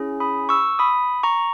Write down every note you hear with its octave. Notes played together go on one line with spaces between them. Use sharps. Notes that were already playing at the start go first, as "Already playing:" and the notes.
Already playing: C#4 E4 G#4
B5 D#6
C#6 E6
B5 D#6
A#5 C#6